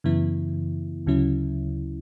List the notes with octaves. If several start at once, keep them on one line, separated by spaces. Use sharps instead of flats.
F#2 C#3 E3 B3 E4
D2 C#3 F#3 C#4 E4